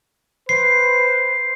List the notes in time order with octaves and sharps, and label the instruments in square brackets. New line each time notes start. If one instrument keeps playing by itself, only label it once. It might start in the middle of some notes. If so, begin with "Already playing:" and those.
[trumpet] B4 [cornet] C5 [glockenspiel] C7